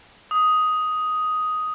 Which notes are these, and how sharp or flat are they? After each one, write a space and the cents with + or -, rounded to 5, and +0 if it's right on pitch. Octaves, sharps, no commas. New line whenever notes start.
D#6 +5